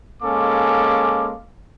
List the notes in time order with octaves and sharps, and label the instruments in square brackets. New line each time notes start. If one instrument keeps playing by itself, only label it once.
[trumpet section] G#3 A#3 C#4 A4 F5 D6